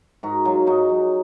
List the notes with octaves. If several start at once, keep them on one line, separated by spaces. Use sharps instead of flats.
G#2 F#4 A#4
F#3 F4 G#4
G#2 D#4 F#4
F#3